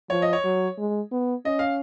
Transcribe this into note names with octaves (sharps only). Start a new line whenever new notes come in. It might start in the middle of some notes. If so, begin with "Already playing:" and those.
F3 C#5
D#5
C#5
F#3
G#3
B3
C#4 D#5
F5